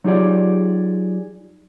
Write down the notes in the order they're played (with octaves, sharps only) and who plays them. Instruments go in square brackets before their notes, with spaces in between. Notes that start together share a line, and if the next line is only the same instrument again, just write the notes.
[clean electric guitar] F#3 D#4 F4 G4 G#4 D5